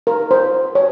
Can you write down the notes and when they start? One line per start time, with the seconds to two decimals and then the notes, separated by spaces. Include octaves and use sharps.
0.07 A#4
0.31 C5
0.75 C#5